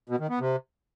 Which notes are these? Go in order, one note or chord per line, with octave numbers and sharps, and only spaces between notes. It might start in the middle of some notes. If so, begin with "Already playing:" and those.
B2
D#3
B3
C3